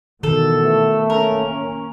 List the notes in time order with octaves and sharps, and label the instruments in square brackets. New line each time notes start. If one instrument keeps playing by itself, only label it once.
[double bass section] B2 E3 [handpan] D#3 [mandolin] A4
[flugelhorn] A3
[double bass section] A#3 C#4 [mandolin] A#4